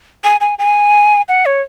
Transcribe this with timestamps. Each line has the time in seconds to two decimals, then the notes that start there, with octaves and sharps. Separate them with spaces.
0.24 G#5
0.40 G#5
0.59 G#5
1.29 F#5
1.46 C#5